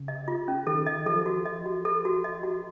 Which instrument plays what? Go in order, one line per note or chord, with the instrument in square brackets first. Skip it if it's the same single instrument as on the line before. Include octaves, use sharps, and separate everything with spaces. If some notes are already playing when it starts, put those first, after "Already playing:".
Already playing: [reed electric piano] C#3
[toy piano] D#5
F4
C#4
[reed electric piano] D#3 [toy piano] A4
[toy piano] D#5
[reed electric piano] F3 [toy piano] A4
[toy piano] F#4
D#5
F#4
A4
F#4
D#5
F#4